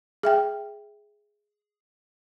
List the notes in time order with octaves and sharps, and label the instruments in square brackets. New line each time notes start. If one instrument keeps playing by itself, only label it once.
[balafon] G#4 E5 G5